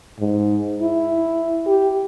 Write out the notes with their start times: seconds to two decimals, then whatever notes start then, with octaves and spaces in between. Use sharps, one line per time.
0.19 G#2
0.82 E4
1.67 G4